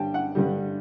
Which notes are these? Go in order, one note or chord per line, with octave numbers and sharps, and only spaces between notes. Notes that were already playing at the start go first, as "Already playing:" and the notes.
Already playing: G2 D3 G3 G5 A5
F#5
G2 D3 G3